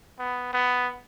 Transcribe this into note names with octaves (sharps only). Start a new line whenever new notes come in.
B3
B3